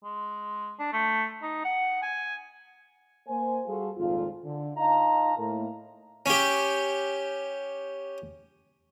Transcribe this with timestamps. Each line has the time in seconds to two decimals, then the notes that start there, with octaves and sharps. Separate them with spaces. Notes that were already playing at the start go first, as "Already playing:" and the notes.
0.03 G#3
0.79 D4
0.93 A3
1.42 D#4
1.65 F#5
2.02 G#5
3.28 A#3 C5 G#5
3.66 G3 F4 F#4 G#4 A4
3.97 G#1 F2 A#2 F4
4.44 D3
4.76 D#4 F4 D#5 F5 A5 A#5
5.37 A2 A#3
6.26 C#4 G4